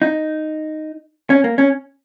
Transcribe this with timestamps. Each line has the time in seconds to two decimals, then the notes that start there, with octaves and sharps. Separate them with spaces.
0.02 D#4
1.30 C#4
1.44 A#3
1.58 C#4